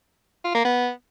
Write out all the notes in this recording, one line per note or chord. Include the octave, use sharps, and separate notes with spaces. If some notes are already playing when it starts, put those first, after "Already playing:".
F4
A#3
B3